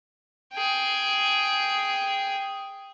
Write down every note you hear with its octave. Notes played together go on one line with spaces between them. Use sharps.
G#4 G5